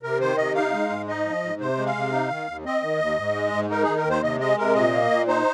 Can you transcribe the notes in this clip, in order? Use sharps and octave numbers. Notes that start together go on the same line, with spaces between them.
C3 A#4
D#3 C5
C3 D#5
D#4 F5
G#3
G#2
D#4 D#5
F3
G#2
C3 C5
G#3
F5
C3
D#4
D#3
D#2
C4 D#5
D#3
D#2
G#2
G#3
G#2
D#4 A#4
D#3 G#4
A#4
D#2
C5
C3 D#5
G#3 D#5
C3 A#4
A#2 D#5
A#3
A#2
D#4 C5